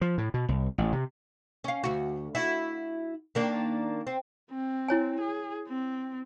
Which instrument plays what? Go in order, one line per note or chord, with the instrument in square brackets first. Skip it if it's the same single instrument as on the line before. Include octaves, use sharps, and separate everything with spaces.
[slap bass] F3
A2
B2
C2
A1
C3
[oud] C#4 F5
D2 F#4
E4 F#4
D#3 A#3 D4
C4
[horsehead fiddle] C4
[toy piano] E4 C#5 G#5
[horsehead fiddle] G#4
C4